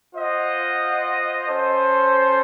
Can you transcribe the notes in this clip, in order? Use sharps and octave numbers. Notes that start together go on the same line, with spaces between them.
F4 C5 D#5 F#5
C#4 A4 C5